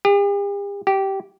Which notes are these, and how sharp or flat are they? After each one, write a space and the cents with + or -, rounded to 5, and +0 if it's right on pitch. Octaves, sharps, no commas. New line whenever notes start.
G4 +45
G4 -15